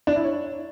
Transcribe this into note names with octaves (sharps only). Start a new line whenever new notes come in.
D4
E4
C#5